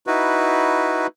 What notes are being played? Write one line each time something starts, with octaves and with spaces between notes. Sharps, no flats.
D#4 E4 F#4 B4